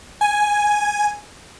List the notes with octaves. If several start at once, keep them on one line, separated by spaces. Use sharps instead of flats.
G#5